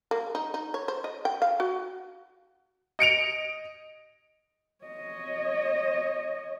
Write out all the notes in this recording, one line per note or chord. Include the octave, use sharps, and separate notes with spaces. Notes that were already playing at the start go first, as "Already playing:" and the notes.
A#3
D#4
D#4
C#5
C5
D#5
G5
F5
F#4
D#5 C#7 D7 F7
C#5 D#5